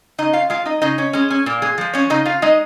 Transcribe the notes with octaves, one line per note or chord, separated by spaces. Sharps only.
C#3 D#4 D#5
F4 F5
G#3 F4 F5
D#4 D#5
C#3 D#4 D#5
C#4 C#5
G#3 C#4
C#4
A#2 A#3
G#3 G#4
F3 G#3
C#4 C#5
C#3 D#4 D#5
F4 F5
G#3 D#4 D#5